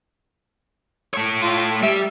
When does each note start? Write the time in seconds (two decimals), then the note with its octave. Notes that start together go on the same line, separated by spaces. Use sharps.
1.14 A3 C#5
1.41 F4
1.83 G3 E5